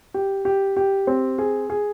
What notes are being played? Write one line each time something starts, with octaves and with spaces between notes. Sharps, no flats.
G4
G4
G4
C4
G#4
G#4